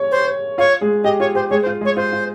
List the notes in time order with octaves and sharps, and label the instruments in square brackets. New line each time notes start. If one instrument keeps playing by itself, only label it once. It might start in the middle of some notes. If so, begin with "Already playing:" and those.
Already playing: [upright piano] C#5 C#6
[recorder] C5
[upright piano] F4 F5 [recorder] C#5
[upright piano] G#3 G#4
[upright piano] G4 [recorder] D#5
[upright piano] F4 [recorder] C#5
[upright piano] G4 [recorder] C5
[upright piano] G#3 G#4 [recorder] C#5
[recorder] C5
[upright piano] F4
G#3 G#4
[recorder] C#5
[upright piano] F4 [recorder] C5
[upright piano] F4